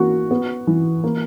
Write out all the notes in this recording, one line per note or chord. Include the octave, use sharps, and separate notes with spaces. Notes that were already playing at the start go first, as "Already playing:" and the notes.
Already playing: E3 A#3 F#4
B3
E3
A#3